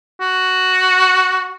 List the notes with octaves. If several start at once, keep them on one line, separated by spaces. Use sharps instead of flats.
F#4